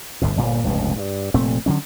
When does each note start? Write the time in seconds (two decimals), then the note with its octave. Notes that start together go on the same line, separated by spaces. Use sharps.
0.22 G1 D2 A2
0.37 G1 A#2 A#3
0.64 F1 C#2 G2 B2
0.96 G2
1.34 F1 A#2 A3 C4
1.66 D3 F#3 C#4